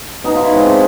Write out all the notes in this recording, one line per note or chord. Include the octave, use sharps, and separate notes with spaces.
B2 D#4
F4
E4
G#3 C4
D4